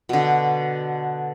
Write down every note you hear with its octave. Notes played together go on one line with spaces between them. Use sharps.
B2 D3